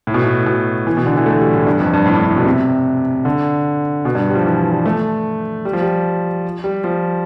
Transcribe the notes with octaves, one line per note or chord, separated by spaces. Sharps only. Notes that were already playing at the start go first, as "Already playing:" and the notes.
A2
B2
A2
B2
E3
B2
D3
E3
A3
G3
A2
G2
F2
G2
A2
G2
A2
B2
C3
D3
B2
G2
G3
F3
E3
G3
A3
G3
F3
G3
G3
F3